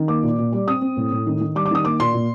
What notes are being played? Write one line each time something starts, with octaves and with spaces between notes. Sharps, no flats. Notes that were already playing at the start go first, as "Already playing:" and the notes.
Already playing: D#3
A#3 D6
A#2
A#2
G3
C4 D#6
C4
A2
A2
D#3
D#3
G3 D6
D6
D#3 D#6
A#3 D6
A#2 C6
A#2